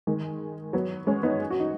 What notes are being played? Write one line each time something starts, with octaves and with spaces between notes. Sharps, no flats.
D#3 G#3
F#3 B3
G#3 C#4
B3 D#4
F#4
D#4